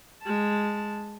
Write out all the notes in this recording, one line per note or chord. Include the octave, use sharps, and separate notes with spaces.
G#3 A5